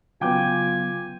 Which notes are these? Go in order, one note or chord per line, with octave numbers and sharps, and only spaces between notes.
C#3 F#3 B3 F4 G5 G#5 D6 G6